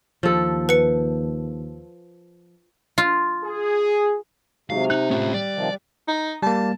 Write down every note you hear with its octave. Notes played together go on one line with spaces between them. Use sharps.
D#2 F3 A4
B4 C#7
F4
G#4
C3 F#3 G#3 D#4 F5
D#4 F#6
A2 C#4 F4
G3 D5
C3 D#3 F3
D#4
G3 A#3 A5